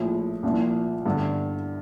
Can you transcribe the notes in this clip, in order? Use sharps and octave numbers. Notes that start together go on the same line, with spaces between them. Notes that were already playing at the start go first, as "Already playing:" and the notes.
Already playing: A#1 A2 F3
C2 A#2 F3
G1 G2 D3